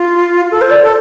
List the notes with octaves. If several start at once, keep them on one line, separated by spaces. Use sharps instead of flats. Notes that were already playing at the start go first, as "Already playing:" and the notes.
Already playing: F4
A4
C5
D5
A4